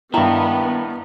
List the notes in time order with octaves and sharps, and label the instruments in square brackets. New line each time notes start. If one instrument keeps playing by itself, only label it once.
[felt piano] G2 E4 [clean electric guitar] D#3 [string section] B3 [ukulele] A5 A#5